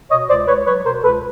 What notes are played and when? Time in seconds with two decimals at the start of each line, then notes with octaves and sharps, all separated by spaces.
0.10 B2 C#5 D#5
0.29 C#2 C5 D5
0.47 C#2 B4 C#5
0.67 F#3 B4 C#5
0.85 B2 A#4 C5
1.04 C#2 A4 B4